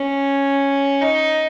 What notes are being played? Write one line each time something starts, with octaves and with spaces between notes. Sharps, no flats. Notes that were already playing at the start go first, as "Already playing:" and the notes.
Already playing: C#4
D#4